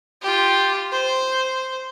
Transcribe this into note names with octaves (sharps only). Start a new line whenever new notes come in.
F4 G4
C5